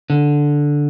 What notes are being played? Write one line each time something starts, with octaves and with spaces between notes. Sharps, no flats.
D3